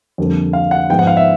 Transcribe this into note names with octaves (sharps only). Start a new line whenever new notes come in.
F2 D3 G3 A#3
F5
F#5
G#2 F3 G#3 B3 G5
F#5
F5
E5